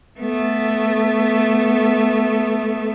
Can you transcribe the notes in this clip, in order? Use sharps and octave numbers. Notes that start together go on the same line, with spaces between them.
A3 B3